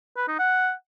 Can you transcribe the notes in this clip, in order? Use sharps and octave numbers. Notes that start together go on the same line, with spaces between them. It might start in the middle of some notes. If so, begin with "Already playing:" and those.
B4
D#4
F#5